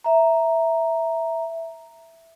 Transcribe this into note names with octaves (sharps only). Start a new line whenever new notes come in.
E5 A#5